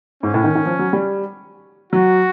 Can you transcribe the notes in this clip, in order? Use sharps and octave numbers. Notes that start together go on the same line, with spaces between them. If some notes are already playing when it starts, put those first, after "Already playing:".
G#2 C#4
A2
D#3
D#3
F3
F#3
G3
F#3 F#4